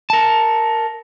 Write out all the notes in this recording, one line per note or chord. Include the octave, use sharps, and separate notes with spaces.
A#4 A5